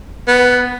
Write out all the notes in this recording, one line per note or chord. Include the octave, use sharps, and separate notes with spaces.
B3